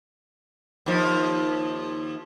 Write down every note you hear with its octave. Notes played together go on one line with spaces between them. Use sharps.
D#2 F3